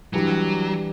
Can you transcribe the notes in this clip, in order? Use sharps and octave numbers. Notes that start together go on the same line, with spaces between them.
E3 F#3 G3 D4